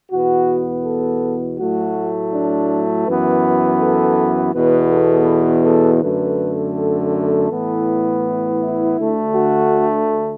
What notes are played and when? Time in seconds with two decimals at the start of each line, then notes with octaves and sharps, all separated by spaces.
0.11 E2 B2 B3 F#4
0.85 A4
1.59 A2 F#3 A3 F#4
2.34 D4
3.07 F#2 E3 B3 B4
3.81 A4
4.54 E2 B2 B3 B4
4.91 A4
5.66 A4
6.02 F#2 D3 A3 B4
6.76 A4
7.13 A4
7.50 A2 E3 B3
8.61 E4
8.98 D2 D3 A3
9.35 F#4